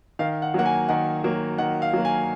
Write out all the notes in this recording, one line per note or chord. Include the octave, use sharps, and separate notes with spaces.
D#3 F5
F#5
F#3 A#3 F#5
G#5
D#3 F#5
F#3 A#3
D#3 F#5
F5
F#3 A#3
G#5